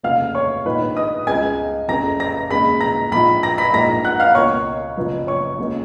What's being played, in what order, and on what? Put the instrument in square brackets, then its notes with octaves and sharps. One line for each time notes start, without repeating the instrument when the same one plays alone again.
[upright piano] F1 D#2 C#3 F5 F6
C#5 C#6
A#1 G#2 D#3 A#3 B4 B5
D#5 D#6
C#2 C#3 G#3 B3 G#5 G#6
F#1 F2 C#3 A#5 A#6
A#5 A#6
D#2 C#3 G#3 B5 B6
A#5 A#6
A#1 G#2 F3 B5 B6
A#5 A#6
B5 B6
A#1 G#2 F3 A#3 A#5 A#6
F#5 F#6
F5 F6
C#2 B2 A#3 C#5 C#6
F#1 F#2 F3 B3
C#5 C#6
D#2 C#3 F3 G#3